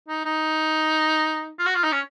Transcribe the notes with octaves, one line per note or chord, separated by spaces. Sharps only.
D#4
D#4
F4
F#4
F4
D#4
C#4